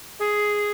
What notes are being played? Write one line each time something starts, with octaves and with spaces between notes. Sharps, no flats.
G#4